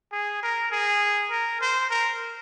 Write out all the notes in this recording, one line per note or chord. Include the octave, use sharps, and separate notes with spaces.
G#4
A#4
G#4
A#4
C5
A#4